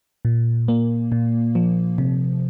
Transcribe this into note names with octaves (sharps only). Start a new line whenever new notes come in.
A#2
A#3
A#2
F3
C3